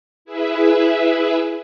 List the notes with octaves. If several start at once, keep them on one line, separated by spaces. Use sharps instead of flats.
E4 G#4 B4 E5